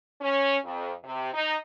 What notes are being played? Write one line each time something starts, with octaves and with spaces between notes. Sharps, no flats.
C#4
F2
C3
D#4